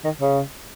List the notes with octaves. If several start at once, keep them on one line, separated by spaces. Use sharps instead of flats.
D#3
C#3